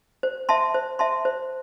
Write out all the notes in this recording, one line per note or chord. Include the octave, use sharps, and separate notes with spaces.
C5
E5 A5 C6
C5
E5 A5 C6
C5